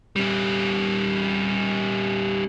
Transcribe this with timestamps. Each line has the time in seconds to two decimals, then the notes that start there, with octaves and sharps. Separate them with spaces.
0.16 G3 C#4